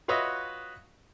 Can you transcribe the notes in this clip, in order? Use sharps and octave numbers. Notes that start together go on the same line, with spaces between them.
F4 F#4 B4 C#5 D#5 E5